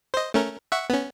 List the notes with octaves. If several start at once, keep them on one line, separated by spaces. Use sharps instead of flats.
C5 D#5
A3 C#4 A#4
E5 F#5 C#6
B3 C#4